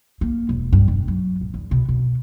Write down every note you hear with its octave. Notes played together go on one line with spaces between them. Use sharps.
A#3
E1
G2
E1
F#3
A#2
E2
B2
B2